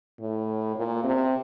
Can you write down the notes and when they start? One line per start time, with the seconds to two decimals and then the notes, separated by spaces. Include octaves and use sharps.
0.20 A2
0.76 A#2
1.04 C3